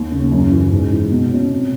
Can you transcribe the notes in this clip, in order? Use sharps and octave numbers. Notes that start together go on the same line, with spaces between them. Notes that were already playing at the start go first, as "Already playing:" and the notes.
Already playing: D#2
C#3
F#2
E3
G#2
E3
B2
C#4
C3